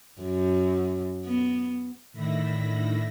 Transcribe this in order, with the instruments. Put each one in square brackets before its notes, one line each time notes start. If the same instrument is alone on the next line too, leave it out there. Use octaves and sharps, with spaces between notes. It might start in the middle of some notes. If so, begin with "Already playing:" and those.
[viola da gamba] F#2
B3
[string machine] A2 D3 D#3 E5 B5 A#6